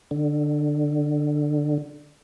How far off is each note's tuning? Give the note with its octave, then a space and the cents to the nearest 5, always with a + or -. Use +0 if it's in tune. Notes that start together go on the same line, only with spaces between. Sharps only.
D3 +15